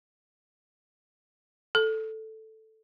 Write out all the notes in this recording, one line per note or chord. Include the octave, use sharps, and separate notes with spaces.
A4